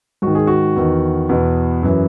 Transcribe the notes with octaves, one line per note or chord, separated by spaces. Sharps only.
G#2 D#3 F#4
G#4
F#4
E2 D#3
E2 B2
F#2 E3